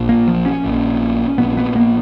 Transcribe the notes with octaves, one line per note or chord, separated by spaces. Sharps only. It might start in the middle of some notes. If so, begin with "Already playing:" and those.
Already playing: A#1 A#2
A#3
F3
C#4
A#1 A#2
A#1 A#2 B3
B3
A#3